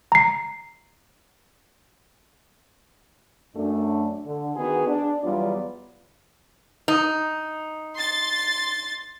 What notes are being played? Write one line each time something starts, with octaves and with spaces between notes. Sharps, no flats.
A#5 C7
F#2 A3 D4
D3
D#3 B3 F#4 G#4
D4
E2 F#3 G3 B3 F4 D5
D#4
C6 A6